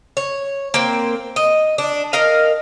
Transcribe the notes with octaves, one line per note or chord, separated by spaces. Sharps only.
C#5
A#3 C4
D#5
D4
A#4 D#5 F5